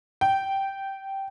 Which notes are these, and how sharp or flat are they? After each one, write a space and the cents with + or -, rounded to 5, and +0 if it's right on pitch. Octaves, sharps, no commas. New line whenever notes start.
G5 -10